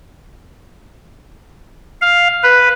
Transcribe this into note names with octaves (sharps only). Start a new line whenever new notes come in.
F5
B4